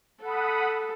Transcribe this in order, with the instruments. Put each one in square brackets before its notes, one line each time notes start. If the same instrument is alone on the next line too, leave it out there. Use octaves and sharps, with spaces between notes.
[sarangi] A4 [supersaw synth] F#5 B5 D#6